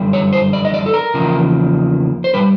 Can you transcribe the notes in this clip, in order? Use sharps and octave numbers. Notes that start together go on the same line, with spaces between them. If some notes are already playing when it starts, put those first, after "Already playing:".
Already playing: F#2 D3 G3
C#5
C5
D5
D#5
D5
A4
A#4
E2 C#3 F3 A#3
C5
B2 G3 B4